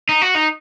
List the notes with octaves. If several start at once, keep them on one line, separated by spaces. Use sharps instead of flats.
D#4
F#4
D#4